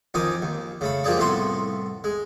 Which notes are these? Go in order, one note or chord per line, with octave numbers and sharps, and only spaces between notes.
F2 D#3 D#4 G#5 D6
D#2
C#3 A3 B5
F3 A#3 G4 G#4 D5
C2 A2 A3 B3 B5 C6
G#3